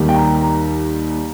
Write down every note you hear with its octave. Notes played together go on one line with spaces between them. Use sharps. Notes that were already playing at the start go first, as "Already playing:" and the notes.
Already playing: D#2 D#3 G3
G5
A#5
A#5